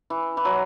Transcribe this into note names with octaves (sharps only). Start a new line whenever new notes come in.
E3
E3
F#3